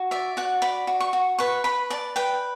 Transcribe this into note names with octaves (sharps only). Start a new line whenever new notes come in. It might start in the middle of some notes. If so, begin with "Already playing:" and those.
Already playing: F#4
D5 E5
F#4 F#5
D5 B5
F#4
C#6
F#4
B4 C#6
B4 B5
D5 A5
B4 G5